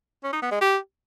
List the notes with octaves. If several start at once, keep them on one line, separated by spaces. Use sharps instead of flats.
C#4
D#4
B3
G#3
G4